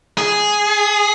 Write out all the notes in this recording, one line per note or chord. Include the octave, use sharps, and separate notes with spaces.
G#4